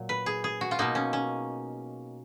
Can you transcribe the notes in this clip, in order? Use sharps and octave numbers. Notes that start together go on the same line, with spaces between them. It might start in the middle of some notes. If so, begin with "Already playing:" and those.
Already playing: A#2 F#3
B4
G#4
G#4
F#4
F4
B2 A#3 D#4
C#4
C#4